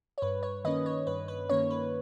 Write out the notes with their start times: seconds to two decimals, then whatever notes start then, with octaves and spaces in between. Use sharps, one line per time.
0.18 C#5
0.22 G2 B4
0.43 C#5
0.64 D#3 A#3 C#4 B4 D#5
0.86 C#5
1.07 G2 B4
1.28 B4
1.49 D#3 A#3 C#4 C#5
1.70 B4